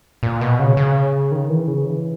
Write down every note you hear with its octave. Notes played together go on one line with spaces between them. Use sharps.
A#2
B2
C#3
C#3
D#3
E3
C#3
E3